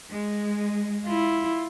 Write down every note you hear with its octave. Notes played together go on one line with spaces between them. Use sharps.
G#3
E4 F4